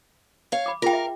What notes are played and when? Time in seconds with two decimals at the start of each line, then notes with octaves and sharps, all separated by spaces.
0.52 C#5 F5
0.66 B5 D6
0.82 F4 G#4 A#4 F5 G5
0.93 E5